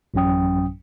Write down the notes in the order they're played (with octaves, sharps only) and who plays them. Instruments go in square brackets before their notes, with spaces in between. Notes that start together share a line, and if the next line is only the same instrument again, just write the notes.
[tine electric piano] A1 F#2 F#3 C#4 G5 D#6